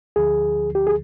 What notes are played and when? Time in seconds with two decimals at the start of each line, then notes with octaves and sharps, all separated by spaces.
0.16 D2 D3 F3 G#4
0.75 G4
0.87 G#4